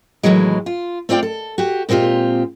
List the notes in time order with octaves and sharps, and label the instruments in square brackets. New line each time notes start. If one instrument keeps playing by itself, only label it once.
[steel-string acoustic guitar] D#2 A2 C#3 E3 F#3 G#3
F4
A3 C4 F4 D5 G5
A4
F#4 G4
A#2 G#3 C4 F4 G4